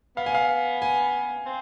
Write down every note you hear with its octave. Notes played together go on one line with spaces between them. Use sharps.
B3 F5
G#5
F5
G#5
C4